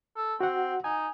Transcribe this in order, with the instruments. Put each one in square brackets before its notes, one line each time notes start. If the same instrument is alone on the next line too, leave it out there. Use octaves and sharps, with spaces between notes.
[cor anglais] A4
[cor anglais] C4 [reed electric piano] F#4 F#5
[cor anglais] D#4 [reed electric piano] G#5